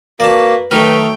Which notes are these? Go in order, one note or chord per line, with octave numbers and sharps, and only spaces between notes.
A#3 F#4 B4 D5 A5
D#3 F#3 A3 A#4 B4 G5